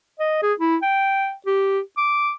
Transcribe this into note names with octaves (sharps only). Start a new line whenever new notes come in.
D#5
G#4
E4
G5
G4
D6